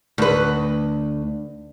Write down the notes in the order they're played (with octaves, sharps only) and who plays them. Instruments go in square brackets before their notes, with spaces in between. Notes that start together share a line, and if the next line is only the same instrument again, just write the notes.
[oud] D2 B4